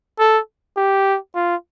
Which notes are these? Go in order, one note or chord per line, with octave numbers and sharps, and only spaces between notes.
A4
G4
F4